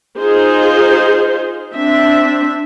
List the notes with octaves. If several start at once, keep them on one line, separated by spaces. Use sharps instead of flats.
D#4 F4 G#4 C5
C4 D4 E5